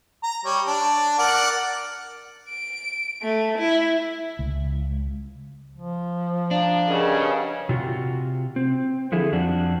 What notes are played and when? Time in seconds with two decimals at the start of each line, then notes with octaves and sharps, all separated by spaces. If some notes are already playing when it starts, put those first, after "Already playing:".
0.23 A#5
0.45 G3 C#5
0.67 D4
1.18 A#4 D5 F#5
2.49 D7
3.22 A3
3.58 E4
4.39 C#2
5.76 F3
6.51 D4 F5 A#5
6.87 G2 C#3 A#4 D#5 F#5
7.69 C3 F4 F#4
8.56 C4
9.12 D3 F3 E4 G#4 A4
9.32 F2 F3 C4 D4 F#4